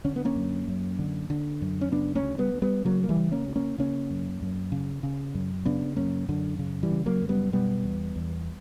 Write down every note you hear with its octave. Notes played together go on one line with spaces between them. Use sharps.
D3 C#4
B3
A#3 C#4
F#2
F#2
D3
D3
F#2
C#4
C#3 B3 D4
A#3 C#4
D2
G3 B3
D2
G3 B3
C#3 F#3 A#3
A#3
E3 G3
C#3
A#3 C#4
D2
A#3 C#4
C#3 A#3 C#4
F#2
F#2
C#3
C#3
F#2
C#3 B3 D4
F#2 A#3 C#4
F#2 D3
C#3
E3 G3
C#3
F#3 A#3
F#2
G3 B3
B2 G3 B3
E2
E2